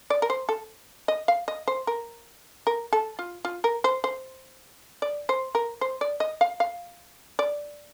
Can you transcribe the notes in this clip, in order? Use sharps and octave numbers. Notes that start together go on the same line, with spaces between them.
D5
A#4
C5
A4
D#5
F5
D#5
C5
A#4
A#4
A4
F4
F4
A#4
C5
C5
D5
C5
A#4
C5
D5
D#5
F5
F5
D5